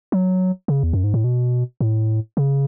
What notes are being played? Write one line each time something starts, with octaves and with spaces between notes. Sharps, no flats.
F#3
C#3
E2
F#2
G#2
A2
B2
A2
C#3